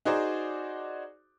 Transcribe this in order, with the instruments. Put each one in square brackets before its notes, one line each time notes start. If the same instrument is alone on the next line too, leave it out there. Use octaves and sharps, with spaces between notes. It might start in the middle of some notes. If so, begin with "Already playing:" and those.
[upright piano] D#4 F#4 G#4 C5 D5